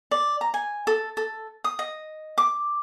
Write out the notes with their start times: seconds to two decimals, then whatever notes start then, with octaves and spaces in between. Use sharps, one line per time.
0.11 D5
0.41 A#5
0.54 G#5
0.87 A4
1.17 A4
1.64 D#6
1.79 D#5
2.38 D6